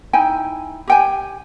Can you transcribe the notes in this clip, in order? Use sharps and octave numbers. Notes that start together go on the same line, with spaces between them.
D#4 E4 G5 G#5
G4 G5 G#5